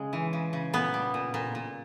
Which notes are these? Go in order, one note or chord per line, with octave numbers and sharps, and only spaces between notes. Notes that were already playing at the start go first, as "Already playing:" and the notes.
Already playing: C#3 G#3
E3
C#3
C#3
A#2 B3
G3
A#2
A#2
A#2